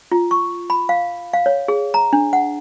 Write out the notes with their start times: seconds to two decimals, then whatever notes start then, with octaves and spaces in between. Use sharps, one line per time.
0.12 F4
0.31 C#6
0.70 B5
0.89 F5
1.34 F5
1.46 C#5
1.68 G#4
1.94 A#5
2.13 D4
2.33 F#5